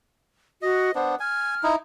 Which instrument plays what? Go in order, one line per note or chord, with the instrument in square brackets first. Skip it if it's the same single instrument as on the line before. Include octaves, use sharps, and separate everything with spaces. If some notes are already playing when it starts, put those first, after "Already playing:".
[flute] F#4 [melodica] D#5
[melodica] B3 D4 [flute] C5
[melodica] G#5 [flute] F6
[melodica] D#4 E4